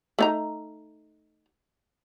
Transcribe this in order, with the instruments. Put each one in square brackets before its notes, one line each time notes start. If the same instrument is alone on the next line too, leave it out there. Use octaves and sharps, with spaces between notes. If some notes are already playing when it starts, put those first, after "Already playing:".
[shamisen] A3 D#4 A#5